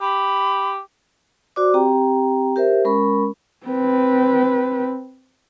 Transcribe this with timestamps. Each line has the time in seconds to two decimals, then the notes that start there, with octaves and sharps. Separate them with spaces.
0.01 G4 B5
1.56 F#4 C5 D5 D6
1.74 C4 G4 G5 A#5
2.56 G4 A#4 C5 E5
2.85 G#3 C#4 A#4 B5 C#6
3.66 C4 B4